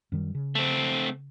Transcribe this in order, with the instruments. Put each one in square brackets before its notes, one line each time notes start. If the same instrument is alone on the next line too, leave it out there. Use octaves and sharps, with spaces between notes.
[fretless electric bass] F#2 D#3 G3
C#3
[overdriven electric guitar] A3 C4